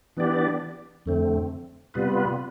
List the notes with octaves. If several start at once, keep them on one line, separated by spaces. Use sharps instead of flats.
E3 B3 D4 G4 D5
F2 D3 A3 C4
C3 G3 B3 F4 B4